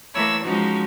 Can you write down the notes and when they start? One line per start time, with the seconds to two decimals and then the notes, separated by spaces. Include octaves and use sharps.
0.14 E3 A3 A#3 C#5 B5 E6
0.44 F3 G#3 C#4 D#4 F#4